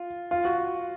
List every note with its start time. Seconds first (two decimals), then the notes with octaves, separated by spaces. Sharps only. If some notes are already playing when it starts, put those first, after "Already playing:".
Already playing: F4
0.31 F4
0.45 F#4